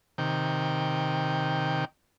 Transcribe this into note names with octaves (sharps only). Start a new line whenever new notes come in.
C3 D#3 G5